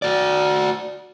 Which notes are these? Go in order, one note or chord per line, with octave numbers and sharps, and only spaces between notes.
F#4 D5